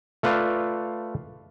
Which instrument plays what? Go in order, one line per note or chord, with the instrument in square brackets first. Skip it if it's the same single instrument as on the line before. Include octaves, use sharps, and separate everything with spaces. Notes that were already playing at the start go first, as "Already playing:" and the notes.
[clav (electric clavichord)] A3 F4 B4 D5 F5